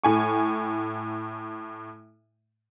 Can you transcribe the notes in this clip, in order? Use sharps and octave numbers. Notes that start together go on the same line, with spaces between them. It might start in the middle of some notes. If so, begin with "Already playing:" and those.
A2 G#5 C#6